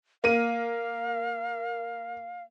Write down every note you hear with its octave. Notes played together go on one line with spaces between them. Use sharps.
A#3 F5 D#7